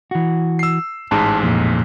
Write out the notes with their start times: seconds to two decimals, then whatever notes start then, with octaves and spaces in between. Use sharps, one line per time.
0.11 E3 F#4
0.59 E6 C7
1.11 A1 G#2 G#3 A5
1.43 F2 A#2